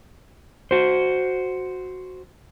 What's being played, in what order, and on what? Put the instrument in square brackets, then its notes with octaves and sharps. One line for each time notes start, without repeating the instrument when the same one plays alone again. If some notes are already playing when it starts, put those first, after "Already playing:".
[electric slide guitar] F#4 C5